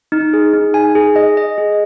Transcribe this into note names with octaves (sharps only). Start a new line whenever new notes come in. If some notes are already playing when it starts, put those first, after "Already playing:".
D#4
G#4
D#4
G#5
G#4
D#5
D#5
G#4